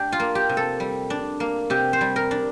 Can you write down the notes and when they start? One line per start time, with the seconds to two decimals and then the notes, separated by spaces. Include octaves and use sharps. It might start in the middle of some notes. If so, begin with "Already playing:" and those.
Already playing: D4 G4
0.12 F4
0.20 A#3
0.35 G4
0.49 C3
0.57 A4
0.80 G3
1.10 D4
1.40 A#3
1.70 C3 G4
1.93 C5
2.01 G3
2.16 A#4
2.31 D4